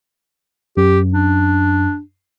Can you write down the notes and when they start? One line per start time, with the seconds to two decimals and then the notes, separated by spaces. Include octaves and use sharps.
0.77 F#2 G4
1.14 D4